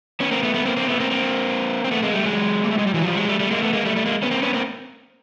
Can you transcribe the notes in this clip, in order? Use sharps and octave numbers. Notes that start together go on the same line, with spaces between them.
B3 C#4
A#3 C4
A3 B3
A3 B3
A#3 C4
A#3 C4
A3 B3
A#3 C4
A#3 C4
C4
A3 B3
G#3 A#3
G3 A3
F#3 G#3
A#3
A3
G#3
G3
E3 F#3
F3 G3
F#3 G#3
G3 A3
G3 A3
G#3 A#3
A3 B3
G#3 A#3
G3 A3
G3 A3
G#3 A#3
B3 C#4
A#3 C4
B3 C#4
A#3 C4